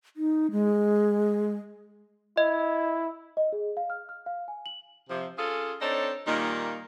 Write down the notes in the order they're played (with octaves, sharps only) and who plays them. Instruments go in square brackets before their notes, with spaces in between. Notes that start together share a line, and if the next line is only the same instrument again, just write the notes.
[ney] D#4
G#3
[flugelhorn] E4 [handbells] D#5
[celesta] D#5
G#4
F5
F6
F6
F5
G#5
F#7
[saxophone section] C3 F3
C#4 F4 G#4 A4
C4 D4 D#4 A4 C#5
A#2 D#3 G3 A#3 D#4